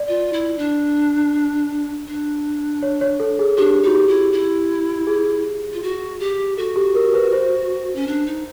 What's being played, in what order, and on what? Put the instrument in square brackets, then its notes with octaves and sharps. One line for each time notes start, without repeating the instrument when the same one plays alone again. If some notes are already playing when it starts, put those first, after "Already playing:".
Already playing: [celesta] D5
[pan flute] F4
E4
D4
D4
[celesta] C#5
C#5
A4
G#4
[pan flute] D4 [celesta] G4
[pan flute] D#4 [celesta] F#4
[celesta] G4
[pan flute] E4
E4
[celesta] G#4
[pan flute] F4
F#4
G4
[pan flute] F#4 [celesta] A4
[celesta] G4
A#4
B4
C5
[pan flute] C#4
D4
D#4